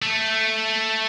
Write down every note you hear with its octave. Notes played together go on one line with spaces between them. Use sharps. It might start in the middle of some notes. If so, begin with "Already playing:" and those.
A3